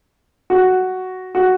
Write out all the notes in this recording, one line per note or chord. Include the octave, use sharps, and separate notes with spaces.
F#4
F#4